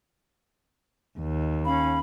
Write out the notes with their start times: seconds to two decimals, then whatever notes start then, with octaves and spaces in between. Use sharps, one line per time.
1.19 D#2
1.65 C#4 F5 B5